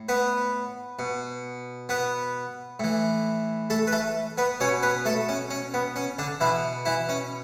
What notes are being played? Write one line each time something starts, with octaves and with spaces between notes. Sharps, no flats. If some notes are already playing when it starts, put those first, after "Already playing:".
Already playing: A2
B3 B4
B2
B3 B4
A2 E3
A3 A4
B4
A3 A4
B3 B4
B2 C#4 C#5
B3 B4
A3 A4
C#4
C#4
B3
C#4
D3 D4
B2 E3 E4
E3 E4
C#4